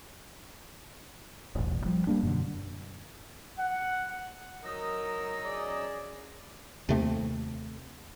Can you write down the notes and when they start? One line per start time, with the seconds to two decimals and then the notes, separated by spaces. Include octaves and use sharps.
1.55 D#1 A1 E2 B2
1.86 F3 G3
2.07 G3 A#3 D4
2.23 F#2 B2 D3
3.59 F#5
4.64 F#3 D#4 A#4 D#5 E6
5.45 C#4 G#4 D5
6.89 D#2 C3 A3 C4